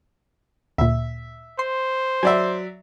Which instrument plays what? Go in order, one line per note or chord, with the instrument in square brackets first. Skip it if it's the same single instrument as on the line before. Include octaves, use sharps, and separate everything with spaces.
[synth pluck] D2 A#2 [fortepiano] E5
[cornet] C5 [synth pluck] C6
[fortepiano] F#3 D5 E5 [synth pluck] G#5